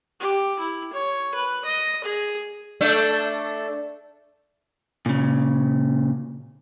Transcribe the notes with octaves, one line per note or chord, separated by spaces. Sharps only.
G4
E4
C#5
B4
D#5
G#4
A3 D4 A4
A#2 C#3